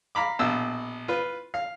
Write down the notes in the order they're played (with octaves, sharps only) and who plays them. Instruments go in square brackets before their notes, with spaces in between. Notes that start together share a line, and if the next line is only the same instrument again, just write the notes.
[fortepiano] F5 A#5 B5 D6
A#1 B2 E6
F4 B4
F5